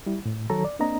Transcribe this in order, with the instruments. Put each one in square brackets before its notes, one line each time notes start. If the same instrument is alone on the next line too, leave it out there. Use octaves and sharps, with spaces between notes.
[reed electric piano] G3 E4
A2
D#3 F#3 A4 C#5 A#5
D5
A#3 C4 D4 D#5 A#5